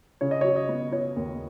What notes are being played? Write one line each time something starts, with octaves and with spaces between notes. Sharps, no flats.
C#3 C#5
D#5
F#3 C#5
D#5
B3
B3 C#5
D#2